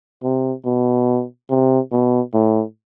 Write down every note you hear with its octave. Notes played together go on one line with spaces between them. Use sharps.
C3
B2
C3
B2
A2